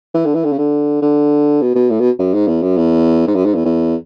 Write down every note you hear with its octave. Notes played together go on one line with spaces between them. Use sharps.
E3
D3
E3
D3
C#3
D3
D3
B2
B2
A2
B2
F#2
G#2
E2
F#2
E2
G#2
F#2
G#2
E2
E2